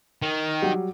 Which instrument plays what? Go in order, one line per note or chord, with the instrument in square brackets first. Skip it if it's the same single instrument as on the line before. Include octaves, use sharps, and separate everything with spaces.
[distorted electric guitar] D#3
[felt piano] F#3 G3